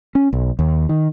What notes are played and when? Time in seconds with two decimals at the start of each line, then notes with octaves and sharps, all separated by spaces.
0.15 C#4
0.33 B1
0.59 D#2
0.89 D#3